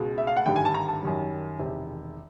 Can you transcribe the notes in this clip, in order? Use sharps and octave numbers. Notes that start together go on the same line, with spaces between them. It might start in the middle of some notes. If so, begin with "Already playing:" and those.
Already playing: C#2 B2 G#3
E5
F5
F#5
G#1 G2 D3 G3 G5
G#5
A5
A#5
A5
F#2 D#3 G3
E1 E2 C3 D#3